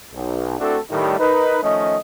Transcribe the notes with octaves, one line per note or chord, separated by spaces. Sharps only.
B1
A3 C4 D4 E4 F#4 A4
A2 D#3 G3
D#4 A#4 B4
D#3 F3 A3 C#4 D#5